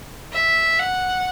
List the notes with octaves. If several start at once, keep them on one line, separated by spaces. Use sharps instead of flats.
E5
F#5